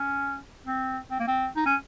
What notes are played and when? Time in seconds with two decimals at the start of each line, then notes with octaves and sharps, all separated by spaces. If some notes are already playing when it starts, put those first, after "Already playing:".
Already playing: C#4
0.67 C4
1.11 C4
1.20 A#3
1.27 C4
1.56 D#4
1.66 C#4